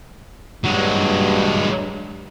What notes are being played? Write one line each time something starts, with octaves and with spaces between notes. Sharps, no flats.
G2 F#3 G#3